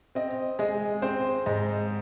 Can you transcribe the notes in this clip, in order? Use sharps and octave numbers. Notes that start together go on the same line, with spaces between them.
C4 D#5
G#3 D#5
C4 C5
G#2 D#5